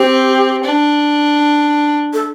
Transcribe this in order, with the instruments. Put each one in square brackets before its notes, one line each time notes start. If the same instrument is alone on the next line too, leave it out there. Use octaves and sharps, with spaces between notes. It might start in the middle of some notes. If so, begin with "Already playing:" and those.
Already playing: [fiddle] C4 [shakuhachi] G4
[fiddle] D4
[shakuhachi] A4